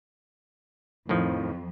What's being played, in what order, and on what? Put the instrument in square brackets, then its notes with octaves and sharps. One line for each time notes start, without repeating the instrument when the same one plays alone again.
[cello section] F2 [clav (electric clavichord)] A2 D#3 F3